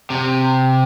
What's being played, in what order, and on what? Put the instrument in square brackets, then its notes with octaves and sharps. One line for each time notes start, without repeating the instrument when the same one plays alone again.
[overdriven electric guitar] C3